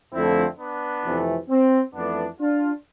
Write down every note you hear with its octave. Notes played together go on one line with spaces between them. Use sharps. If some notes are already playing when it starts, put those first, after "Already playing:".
F2 D3 F3 A3 C4 E4
B3 D4
F2 C3 E3 A3
C4
F2 E3 A3 B3 D4
D4 F4